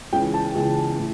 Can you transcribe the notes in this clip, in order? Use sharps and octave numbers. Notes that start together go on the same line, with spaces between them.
C#2 C#3 E3 G5
A5
C#2 C#3 E3
A2